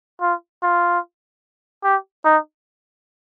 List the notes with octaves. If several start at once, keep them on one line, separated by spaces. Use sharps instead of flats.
F4
F4
G4
D#4